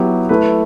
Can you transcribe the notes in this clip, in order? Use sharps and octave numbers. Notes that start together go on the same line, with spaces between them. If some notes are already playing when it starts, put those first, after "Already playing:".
Already playing: F#3 B3 E4 G4
A3 E4 B4